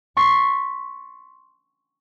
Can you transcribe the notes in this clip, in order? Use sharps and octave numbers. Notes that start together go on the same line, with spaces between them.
C6 C#6 A6 B6 C7